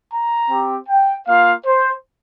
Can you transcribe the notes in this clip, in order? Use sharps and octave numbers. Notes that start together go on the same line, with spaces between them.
A#5
C4 G4
G5
A#3 F4 F5
C5